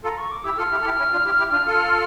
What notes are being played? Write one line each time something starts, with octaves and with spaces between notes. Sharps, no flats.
F4 A4 A#5
C#6
D6
E4 G4 E6
F4 A4 F6
E4 G4
A4
E4 G4
C#4 E4
D4 F4
E4 G4
E4 G4
D4 F4
F4 A4